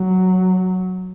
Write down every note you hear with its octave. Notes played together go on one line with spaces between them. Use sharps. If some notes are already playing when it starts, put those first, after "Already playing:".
Already playing: F#3